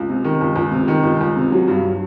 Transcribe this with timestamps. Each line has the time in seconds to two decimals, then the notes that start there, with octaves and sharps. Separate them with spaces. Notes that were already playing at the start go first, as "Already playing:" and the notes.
Already playing: C#2
0.09 C3
0.25 D#3
0.41 C#2
0.56 C#2
0.72 C3
0.88 D#3
1.04 C#2
1.21 C#2
1.37 C3
1.52 F#3
1.68 G2